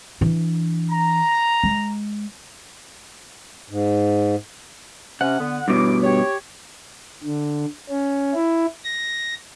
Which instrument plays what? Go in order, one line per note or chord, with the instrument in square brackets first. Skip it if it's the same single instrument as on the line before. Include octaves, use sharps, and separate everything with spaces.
[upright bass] E3 D4
[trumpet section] A#5
[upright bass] G#3
[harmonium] G#2
[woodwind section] C3 C#4 [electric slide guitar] F#5
[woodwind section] D3 B3
[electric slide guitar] G2 B2 [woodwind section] C#4 E4 D6
[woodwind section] G4 C#5
[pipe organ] D3
C#4
E4
A#6